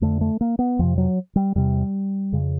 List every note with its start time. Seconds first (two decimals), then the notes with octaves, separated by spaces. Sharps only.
0.01 F2 D3 A3
0.21 A3
0.41 A#3
0.59 B3
0.79 F2 C3 F3
0.98 F#3
1.36 G3
1.55 E2 C3 G3
2.32 F2 C#3